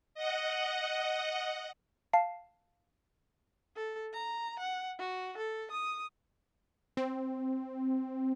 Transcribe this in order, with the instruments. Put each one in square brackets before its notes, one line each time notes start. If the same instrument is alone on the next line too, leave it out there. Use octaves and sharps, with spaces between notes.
[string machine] D#5 F#5
[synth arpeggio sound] F5 A5 C7
[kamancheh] A4
A#5
F#5
F#4
A4
D#6
[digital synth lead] C4